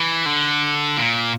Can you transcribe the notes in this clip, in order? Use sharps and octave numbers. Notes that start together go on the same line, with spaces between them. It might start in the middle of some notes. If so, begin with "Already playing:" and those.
Already playing: E3
D3
A#2